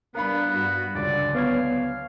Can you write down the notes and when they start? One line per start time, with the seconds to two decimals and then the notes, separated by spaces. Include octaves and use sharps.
0.15 G3 B3 D4 A#4 F5 B5
0.51 G2 F#4
0.95 C#2 D3 F#3 D5
1.35 B3 C#5 F5 G#6